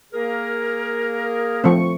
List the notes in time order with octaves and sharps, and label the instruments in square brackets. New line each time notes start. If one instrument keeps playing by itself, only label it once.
[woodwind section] A#3 G#4 A#4
[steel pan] F3 A3 C4 [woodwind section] C#6